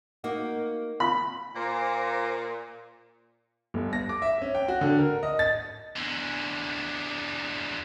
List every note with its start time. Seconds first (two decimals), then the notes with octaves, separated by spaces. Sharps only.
0.24 A#3 D#4 F#4
1.00 B5
1.56 A#2 C5 A#5 D6
3.74 G1
3.93 A#6
4.09 D6
4.22 E5
4.42 C#4
4.55 G5
4.68 F#4
4.81 D3
4.99 A#4
5.23 D#5
5.39 A6
5.96 E2 D3